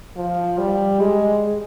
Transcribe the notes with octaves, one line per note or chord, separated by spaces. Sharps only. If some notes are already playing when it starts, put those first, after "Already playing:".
F3
G3
G#3